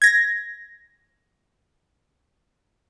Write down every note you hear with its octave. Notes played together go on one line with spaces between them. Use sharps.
G#6 A#6